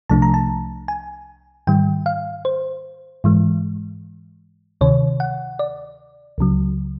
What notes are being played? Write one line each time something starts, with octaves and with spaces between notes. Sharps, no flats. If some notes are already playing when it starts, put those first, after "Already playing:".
C2 C3 F3 A3 D4 A5
A#5
A5
G#5
G#2 D#3 G3 G5
F5
C5
G#2 E3 G#3
D2 C3 D#3 C#5
F#5
D5
C#2 C#3 F#3